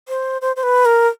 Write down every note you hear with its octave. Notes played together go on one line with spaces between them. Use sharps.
C5
C5
C5
B4
A#4